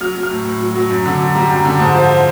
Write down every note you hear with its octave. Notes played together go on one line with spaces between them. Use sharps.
F#3 F6
F#3
F6
A2
A2
F#3
F#3
F#2
D3
F#2
G3 A#5
F#2
D3
G#2 A5
F3